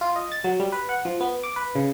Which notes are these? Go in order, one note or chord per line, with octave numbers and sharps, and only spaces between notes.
F4
D#5
A6
F#3
G3
B4
F#5
F3
B3
D6
B4
C#3